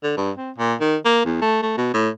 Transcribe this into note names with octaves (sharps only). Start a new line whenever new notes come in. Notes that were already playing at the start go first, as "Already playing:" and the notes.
D3
G2
C4
A#2
D#3
A#3
E2
A3
A3
B2
A2